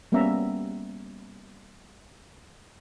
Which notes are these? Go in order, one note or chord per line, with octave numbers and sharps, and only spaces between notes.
G3 A#3 B3 C#4 E5 A#5